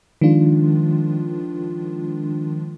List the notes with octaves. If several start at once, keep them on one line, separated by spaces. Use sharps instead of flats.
D#3 F3 G#3 D4 F4